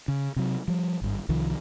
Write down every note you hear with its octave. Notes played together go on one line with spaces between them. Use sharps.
C#3
C3 F#3
F3 G3
G#1 G2
C2 D#3 F3